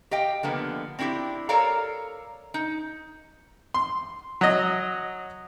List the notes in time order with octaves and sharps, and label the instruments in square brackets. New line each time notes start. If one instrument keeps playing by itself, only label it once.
[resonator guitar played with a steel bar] G4 D#5 F5 G5
D3 F3 A#3 B3
C4 D4 E4 F#4 G4
A4 A#4 C#5 D5 F5 A#5
D#4
[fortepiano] C6
F#3 D#5